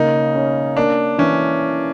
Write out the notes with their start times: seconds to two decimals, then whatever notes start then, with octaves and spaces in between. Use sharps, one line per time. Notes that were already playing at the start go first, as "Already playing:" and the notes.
Already playing: C#3 A#3 D#4
0.36 C#4
0.77 A#3 D4
1.18 E3 C#4